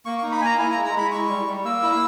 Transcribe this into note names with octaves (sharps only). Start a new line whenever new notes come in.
A#3 C#6
C#6
D#4
B5
A#3 G#5 A#5
E4 G#5
G#3 A#5
A#5
G#3 B5
E4 C#6
G3
G3
A#3 E6
E4